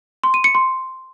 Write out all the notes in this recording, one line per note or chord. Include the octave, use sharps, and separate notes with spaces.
C6
D#7
C#7
C6